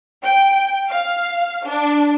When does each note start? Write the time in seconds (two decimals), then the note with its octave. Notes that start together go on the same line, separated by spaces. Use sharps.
0.23 G5
0.90 F5
1.66 D4